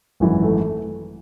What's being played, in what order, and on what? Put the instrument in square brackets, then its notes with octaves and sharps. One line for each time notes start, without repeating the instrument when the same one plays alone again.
[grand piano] G#1 F#2 E3
A3